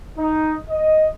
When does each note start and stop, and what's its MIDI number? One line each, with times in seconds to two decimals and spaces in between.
0.18 0.55 63
0.70 1.08 75